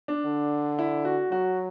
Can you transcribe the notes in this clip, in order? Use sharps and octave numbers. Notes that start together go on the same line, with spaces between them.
D4
D3
E4
F#4
F#3 F#4